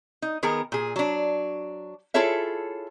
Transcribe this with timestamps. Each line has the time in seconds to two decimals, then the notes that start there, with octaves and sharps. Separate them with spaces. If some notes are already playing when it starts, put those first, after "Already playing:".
0.22 D#4
0.43 D#3 B3 G#4 A#4
0.72 A#2 G#4
0.96 F#3 D4
2.14 E4 F4 G#4 A4 C#5 E5